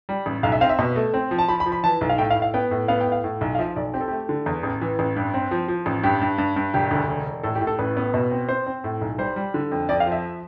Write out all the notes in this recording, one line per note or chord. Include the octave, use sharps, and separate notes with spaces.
G3
A1
B1 F5
E5
C4 F5
E5
B2
A3
C4
F3
A5
F3 B5
B5
F3
B5
E3 A5
B1
F5
A2 G5
F5
A2
F5
B3 G5
A2
B3 F5
G5
A2
F5
A2
B1
F5
F3 E5
B1 D5
C4 G4
A4
A3 G4
D3
E2
A1
E3
A1
G2
C4
F3
F3
A1
G2 G4
G2
G2
G2
E1 G4
D2
E1
E1
A2 A4
G4
A2
A4
A1 B4
B3
B2
C4
C4 C5
C4
A2
B1
G3 C5
G3
D3
F2
F2 D5
F5
F3
E5